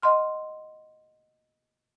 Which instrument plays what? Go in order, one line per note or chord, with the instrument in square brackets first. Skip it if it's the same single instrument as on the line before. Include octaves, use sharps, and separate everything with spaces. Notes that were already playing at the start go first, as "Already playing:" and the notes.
[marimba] D#5 F#5 C6 F6